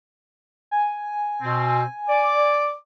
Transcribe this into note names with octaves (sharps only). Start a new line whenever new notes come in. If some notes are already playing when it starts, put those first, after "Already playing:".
G#5
B2 C4
D5 D6